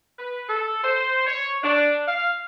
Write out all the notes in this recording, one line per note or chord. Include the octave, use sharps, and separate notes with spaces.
B4
A4
C5
C#5
D4
F5